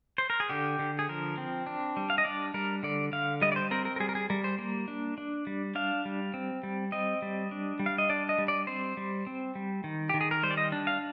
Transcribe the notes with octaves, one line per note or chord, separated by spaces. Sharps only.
C5
A#4
G#4
D3 G4
D3
G#4
F3 A#4
C4
D4
G3
F5
D#5
D4 D5
G3 A#4
D3 D5
D3 F5
G3 D#5
D5
C5
C4 A#4
A#4
A#4
G3 G#4
A#4
G#4
G3 A#4
C5
A#3
D4
D4
G3
D4 F5
G3
C4
G3
C4 D#5
G3
D4
G3
F5
D#5
D4 D5
D#5
G3
D5
C4 C5
G3
C4
G3
D#3
D#3 G4
G#4
A#4
G3 C5
D5
D#5
D4
F5